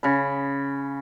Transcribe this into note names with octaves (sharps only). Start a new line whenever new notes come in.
C#3 B5